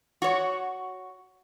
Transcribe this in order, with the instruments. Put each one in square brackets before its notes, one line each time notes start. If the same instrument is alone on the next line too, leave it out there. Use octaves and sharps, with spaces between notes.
[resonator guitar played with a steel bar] F#4 C#5